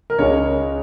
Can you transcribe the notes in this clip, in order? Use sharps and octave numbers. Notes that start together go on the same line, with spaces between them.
A#4
C#2 C#3 G#3 C#5